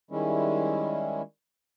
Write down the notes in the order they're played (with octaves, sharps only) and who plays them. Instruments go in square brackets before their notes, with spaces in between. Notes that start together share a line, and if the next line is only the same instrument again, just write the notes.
[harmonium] D#3 G3 G#3 C#4 E4